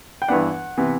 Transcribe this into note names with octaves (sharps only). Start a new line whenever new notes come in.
G5
G2 E3 B3 D4 F#5
C3 E3 B3